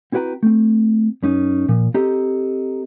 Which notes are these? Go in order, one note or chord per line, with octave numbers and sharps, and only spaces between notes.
C4 E4 F#4 B4 G5 A#5
A3 C4
F#2 C#4 D#4
A#2 F3
C4 G4 A4 D#5 A#5